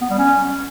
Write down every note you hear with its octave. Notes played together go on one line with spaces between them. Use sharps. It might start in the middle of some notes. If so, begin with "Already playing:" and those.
B3
G3
C#4